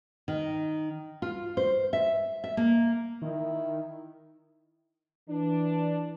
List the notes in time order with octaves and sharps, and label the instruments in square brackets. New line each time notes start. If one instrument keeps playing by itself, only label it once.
[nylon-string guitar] D#3
F4
C5
E5
E5
A#3
[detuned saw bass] D#3 [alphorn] E4
[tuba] E3 [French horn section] D4